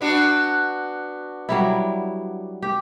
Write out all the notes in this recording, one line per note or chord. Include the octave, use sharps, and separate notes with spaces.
B3 D4 F#4
F#3 G3 E4
G4